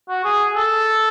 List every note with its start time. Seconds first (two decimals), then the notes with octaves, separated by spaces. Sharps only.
0.09 F#4
0.25 G#4
0.55 A4